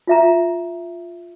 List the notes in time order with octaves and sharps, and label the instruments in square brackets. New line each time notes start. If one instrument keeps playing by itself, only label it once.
[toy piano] F4 E5 A#5